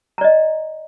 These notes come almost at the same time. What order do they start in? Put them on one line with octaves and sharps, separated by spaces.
A#5 D5 D#5